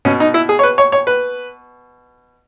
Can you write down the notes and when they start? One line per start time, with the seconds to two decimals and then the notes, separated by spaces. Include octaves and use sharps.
0.05 B2 C#4
0.20 D#4
0.34 E4
0.49 G#4
0.59 C#5
0.63 B4
0.78 C#5
0.92 C#5
1.07 B4